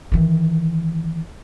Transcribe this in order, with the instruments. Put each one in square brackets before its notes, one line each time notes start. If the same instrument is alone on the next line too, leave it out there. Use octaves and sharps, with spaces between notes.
[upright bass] D#3 E3